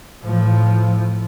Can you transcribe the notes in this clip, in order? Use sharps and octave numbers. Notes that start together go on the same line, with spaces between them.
A2 F3